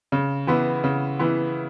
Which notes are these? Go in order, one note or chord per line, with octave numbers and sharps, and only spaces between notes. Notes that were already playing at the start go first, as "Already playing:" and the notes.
C#3
E3 B3 E4
C#3
E3 B3 E4